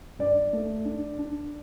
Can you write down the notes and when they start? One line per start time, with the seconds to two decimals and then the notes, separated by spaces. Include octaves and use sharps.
0.19 G2 D5
0.53 A3
0.85 D4
1.18 D4